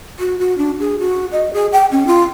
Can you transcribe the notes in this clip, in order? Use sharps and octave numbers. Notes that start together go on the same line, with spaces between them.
F#4
F#4
D4
G#4
F#4
D#5
G#4
G5
C#4
F4